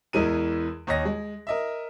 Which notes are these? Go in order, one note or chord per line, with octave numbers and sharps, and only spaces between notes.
E2 E3 G#3 A#4 D#7
D#2 C#5 D#5 A#6
G#3
A#4 D#5 E5